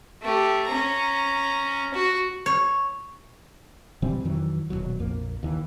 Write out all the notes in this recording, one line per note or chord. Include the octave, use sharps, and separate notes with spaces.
A3 G4
C#4 A#5
F#4
C#5
B2 E3 G3 C4
F2 D#3 E3 F#3
D#1 B1 B2 F#3
A#1 F2 A#3
D#2 E3